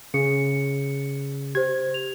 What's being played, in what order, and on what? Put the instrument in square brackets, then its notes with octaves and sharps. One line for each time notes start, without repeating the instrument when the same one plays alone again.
[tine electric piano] C#3 [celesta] C#7
[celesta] G4 C5 [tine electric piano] G#6
[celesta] F7